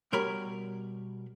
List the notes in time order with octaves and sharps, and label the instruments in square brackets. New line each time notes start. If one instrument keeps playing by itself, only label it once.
[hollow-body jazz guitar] B2 G3 A#4 C#5 B5